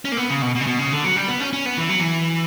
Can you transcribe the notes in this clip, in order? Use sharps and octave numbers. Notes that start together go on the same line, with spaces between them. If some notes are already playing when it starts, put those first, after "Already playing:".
C#4
A#3
B3
C#3
B2
B2
C#3
B2
C#3
D3
F#3
G3
B3
C#4
C#4
B3
E3
F#3
E3